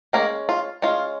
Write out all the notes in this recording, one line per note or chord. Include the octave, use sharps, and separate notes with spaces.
G#3 A#3 C#4 A#4
F4
G#3 C#4 F4